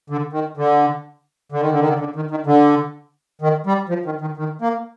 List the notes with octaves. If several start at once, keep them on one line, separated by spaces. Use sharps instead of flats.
D3
D#3
D3
D3
D#3
D3
D#3
D3
D3
D#3
D#3
D3
D#3
G3
F3
D#3
D#3
D#3
A#3